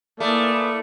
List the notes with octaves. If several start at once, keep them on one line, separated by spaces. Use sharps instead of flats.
A3 A#3 E4 F4 B4 D5 G#5 D#6